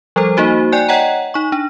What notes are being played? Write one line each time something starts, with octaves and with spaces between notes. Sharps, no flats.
F3 G3 A4 C5
A#3 D#4 F#4 C5
D5 G5 G#5 F#6
C#5 D#5 F#5 G5 A#5
D#4 C#6
D4